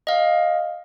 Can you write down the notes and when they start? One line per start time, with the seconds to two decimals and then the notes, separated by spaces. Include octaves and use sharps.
0.07 D#5 F5